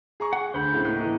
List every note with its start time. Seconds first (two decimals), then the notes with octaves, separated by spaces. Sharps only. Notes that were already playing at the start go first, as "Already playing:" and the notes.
0.20 G#4 A#5 C#6
0.33 G#4 F#5
0.54 D2 C5 B5 G6
0.73 A2 C#3 C4
0.85 A2 A#3 D#4 F#6
1.00 A2 E3